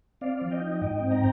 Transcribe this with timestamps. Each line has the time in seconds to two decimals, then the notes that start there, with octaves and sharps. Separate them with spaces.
0.21 C4 D5 F5
0.41 F3
0.51 D#5 G5
0.61 D#4
0.81 G#2 D#5 G5
1.01 C4
1.11 G5 A#5